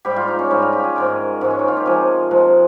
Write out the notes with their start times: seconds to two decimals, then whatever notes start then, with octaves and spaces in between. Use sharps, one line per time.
0.05 G#2 G3 G4
0.16 F4
0.28 D#4
0.39 C#4
0.51 G#2 G3 D#4
0.62 F4
0.73 G4
0.84 G#4
0.95 G#2 D#3 G#3 A#4
1.41 G#2 D#3 G#3
1.51 C#4
1.59 D#4
1.68 F4
1.77 G4
1.86 C3 F3 G#3 G#4
2.31 C3 F3 G#3